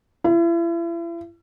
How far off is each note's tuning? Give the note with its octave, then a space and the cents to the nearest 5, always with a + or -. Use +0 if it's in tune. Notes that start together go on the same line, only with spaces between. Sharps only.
E4 +40